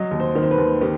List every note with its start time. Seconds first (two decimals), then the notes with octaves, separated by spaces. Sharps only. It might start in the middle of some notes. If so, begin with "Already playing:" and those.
Already playing: F#3 D#5
0.11 D#2
0.20 C5
0.35 D#3
0.43 C5
0.51 B4
0.58 D#2
0.81 D#3 G4